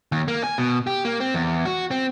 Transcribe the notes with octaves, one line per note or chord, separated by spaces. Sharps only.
D#2
A#3
G#5
B2
G4
A#3
C4
E2
F#4
C4